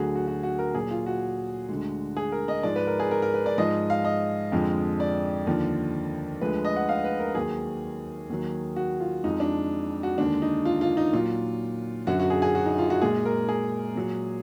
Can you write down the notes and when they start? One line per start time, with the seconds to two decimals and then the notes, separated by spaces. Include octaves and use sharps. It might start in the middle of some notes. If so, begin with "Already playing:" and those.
Already playing: D2 D3 F#3 F#4 G#4
0.15 F#4
0.28 F#4
0.43 F#4
0.59 A#4
0.75 A#2 F#3 G#4
0.91 F4
1.06 F#4
1.69 D2 D3 G#3
2.17 G#4
2.32 A#4
2.48 D#5
2.63 G#2 F3 G#3 D5
2.76 B4
2.87 A#4
3.00 G#4
3.11 A#4
3.22 A#4
3.34 B4
3.46 D5
3.58 G#2 F3 G#3 D#5
3.90 F5
4.05 D#5
4.52 F2 D3 F3 G#3
5.00 D5
5.46 D#2 D3 F3
6.41 D2 D3 F3 G#3 B4
6.65 D#5
6.76 F#5
6.89 F5
7.04 B4
7.20 A#4
7.35 D#2 D#3 F#3 G#4
8.30 D#2 D#3 F#3
8.76 F#4
9.00 F4
9.24 F2 F3 G#3 D#4
9.40 D4
10.03 F#4
10.18 D#2 D3 G#3 D4
10.42 D#4
10.65 F4
10.81 F4
10.97 D#4
11.13 A#2 F#3 F4
12.07 F#2 D3 F#3 F#4
12.20 F#4
12.30 G#4
12.42 G#4
12.55 F#4
12.66 D#4
12.78 F4
12.90 F#4
13.02 A#2 G#3 G#4
13.25 A#4
13.49 G#4
13.96 A#2 F#3